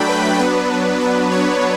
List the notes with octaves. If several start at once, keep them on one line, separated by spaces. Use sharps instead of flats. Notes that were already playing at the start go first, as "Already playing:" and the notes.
Already playing: F#3 A3 D4 G5 B5
B4
F#3 B3 D4 B4
B4
C#5